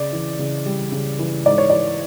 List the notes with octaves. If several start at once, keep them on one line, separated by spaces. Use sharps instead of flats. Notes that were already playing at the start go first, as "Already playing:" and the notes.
Already playing: C#3 D5
E3
C#3
G3
C#3
E3
G#2 D5
C#5
E3 D5